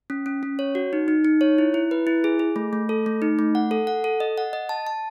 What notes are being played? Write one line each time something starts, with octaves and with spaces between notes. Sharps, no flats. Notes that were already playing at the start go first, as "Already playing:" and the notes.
C#4
C#4
C#4
C#5
F#4
D#4
D#4
D#4
C#5
E4
E4
B4
E4
G#4
G#4
A3
A3
A4
A3
D#4
A3
F#5
A4
F#5
A4
D#5
F#5
D#5
A5
A5